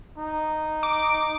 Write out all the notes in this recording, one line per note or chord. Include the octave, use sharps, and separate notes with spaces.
D#4
D6